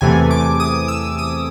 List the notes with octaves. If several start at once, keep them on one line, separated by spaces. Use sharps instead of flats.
E2 C3 E3 A3 G#5
D6
D#6
E6
D#6